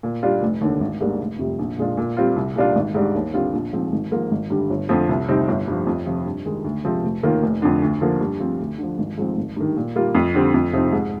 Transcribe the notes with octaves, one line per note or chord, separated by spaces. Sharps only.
A#2
G3 D4 F4
F1
D#2 D3
G#1
G#2 G3 A#3 D4
F1
F2 C3 G3
A#1
A#2 G#3 D4 F4
A#2
G3 C4 F4
C2
A#2 G3 D4 F4
G#1
G#2 G3 D4
D#2
D3 G3 C4 F4
A#1
G#2 F3 C4
G#1
G#2 F3 A#3 F4
G#1
G2 D3 G3
G1
F2 D3 F3
C2
C3 G3 C4 D#4
G1
G2 F3
F2
C3 F3 C4
G2
D#3 G#3 D#4
D2
C3 F3 G#3 C4
F1
D#2 D#3 A#3 F4
F1
F2 D3
D2
D3 F3 A#3
G2
F3 C4
D2
D3 F3
G#1
G#2 F3 G#3 C4
G#1
G2 D#3
A#2
G3 A#3 F4
F2
D3 G3 C4
F2
C3 F3 C4 D#4
G#2